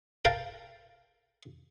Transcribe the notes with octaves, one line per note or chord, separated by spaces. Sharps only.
A#4 F5 G5 A5